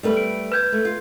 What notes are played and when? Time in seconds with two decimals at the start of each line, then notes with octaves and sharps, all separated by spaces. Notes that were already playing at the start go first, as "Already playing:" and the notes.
0.03 G3 A3 B4
0.17 D7
0.52 B4 G6 G#6
0.72 A3
0.85 F4